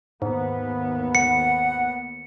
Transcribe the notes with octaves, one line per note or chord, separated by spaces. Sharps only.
D#2 G#2 B3
F#5 C#7